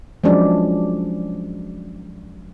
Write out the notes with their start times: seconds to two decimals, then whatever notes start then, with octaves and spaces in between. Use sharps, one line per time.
0.24 F3 F#3 G#3 C#4 D4 D5